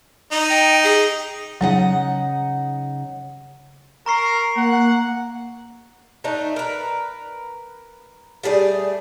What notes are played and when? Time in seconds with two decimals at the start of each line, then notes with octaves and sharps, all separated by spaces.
0.32 D#4 A#5
0.49 G5
0.84 G#4
1.61 C#3 F#3 D#4 F#5
4.06 A#4 A#5 C#6 C7
4.56 A#3 F#5
6.24 A3 D4 D#4
6.56 A#4 B4
8.43 G3 A3 G#4 D5